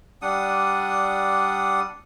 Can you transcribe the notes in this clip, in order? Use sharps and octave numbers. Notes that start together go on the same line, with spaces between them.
G3 D4 F#5 D#6